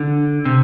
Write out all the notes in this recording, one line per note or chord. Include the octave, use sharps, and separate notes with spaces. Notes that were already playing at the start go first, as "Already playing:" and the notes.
Already playing: D3
C3